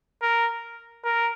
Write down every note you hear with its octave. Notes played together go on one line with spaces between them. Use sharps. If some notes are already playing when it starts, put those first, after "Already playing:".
A#4
A#4